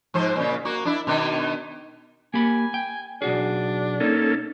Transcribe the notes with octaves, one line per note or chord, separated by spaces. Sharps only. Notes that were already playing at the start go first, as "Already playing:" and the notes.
G#2 F3 C5
A#2 C#3
A#3 F#4
D4 E4
B2 D#3 D4
A#3 G4 G#5 B5
G5
B1 D4 F#4 G#4
A#3 C#4 D#4 A4